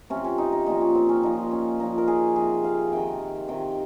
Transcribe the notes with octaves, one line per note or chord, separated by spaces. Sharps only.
C3 F3 C#4
C#4
D#4
D#4
A#2 F3 D#4
C#4
C4
C#4
A#2 F3 D#4
C#4
A#2 F3 D#4
A#4
G#4
C3 F3 G#4
F5
C3 D#3 G5
C3 D#3 G5